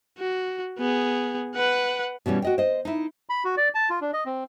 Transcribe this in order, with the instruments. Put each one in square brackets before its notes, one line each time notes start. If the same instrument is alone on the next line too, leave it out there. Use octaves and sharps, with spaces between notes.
[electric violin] F#4
B3 G#4
B4 F#5
[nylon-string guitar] B2 E3 G3 C#4
F#4 D#5 G5
C5 D#5
D#4 E4
[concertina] B5
F#4
D5
A5
F4
D4
D#5
C4